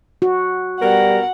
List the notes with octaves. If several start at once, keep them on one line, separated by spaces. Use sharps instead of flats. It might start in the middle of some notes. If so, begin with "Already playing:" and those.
F#4
B2 G3 A#4 F#5